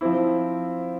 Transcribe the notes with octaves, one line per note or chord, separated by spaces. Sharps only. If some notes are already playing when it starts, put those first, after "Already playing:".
F3 C4 E4